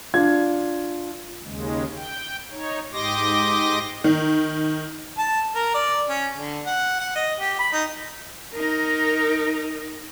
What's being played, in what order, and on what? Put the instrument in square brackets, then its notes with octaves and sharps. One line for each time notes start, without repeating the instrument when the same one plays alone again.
[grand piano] D4 F4 G#6
[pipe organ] D#2 C#3 G#3
G5
D#4 C#5
G#2 G4 D#5 C6 D6 A#6
[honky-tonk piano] D#3
[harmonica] A5
A#4
D5
C#4
D3
F#5
F#5
D#5
G4
B5
D#4
[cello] D#4 A#4